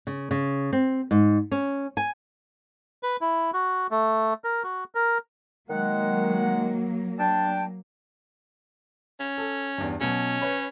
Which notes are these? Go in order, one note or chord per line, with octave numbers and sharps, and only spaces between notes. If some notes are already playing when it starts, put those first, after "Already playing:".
C#3
C#3
C4
G#2
C#4
G#5
B4
E4
F#4
A3
A#4
F#4
A#4
D#3 F#3 G#3 A#3 F#5
D4 G5 A5
C#4
A4
E2 G2
B2 F#3 C#4
B4 C#5 B5